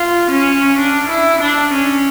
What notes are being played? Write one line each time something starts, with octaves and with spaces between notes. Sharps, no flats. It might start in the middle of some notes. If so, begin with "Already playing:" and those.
Already playing: F4
C#4
D4
E4
D4
C#4